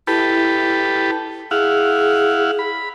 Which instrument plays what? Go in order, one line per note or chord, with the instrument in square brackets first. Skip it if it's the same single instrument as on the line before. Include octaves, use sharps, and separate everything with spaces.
[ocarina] E4 [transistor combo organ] G4 A4 B4
[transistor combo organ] E4 F5 F#5 [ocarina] G#4
[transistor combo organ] B5